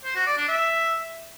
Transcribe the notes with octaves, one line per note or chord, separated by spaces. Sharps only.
C5
F#4
D5
D4
E5